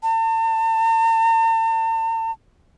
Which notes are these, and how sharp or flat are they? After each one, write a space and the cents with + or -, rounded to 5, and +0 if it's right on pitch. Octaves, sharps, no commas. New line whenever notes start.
A5 +45